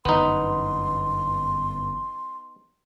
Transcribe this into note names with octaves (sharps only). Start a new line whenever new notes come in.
G1 F#2 E3 B3 D#4 C6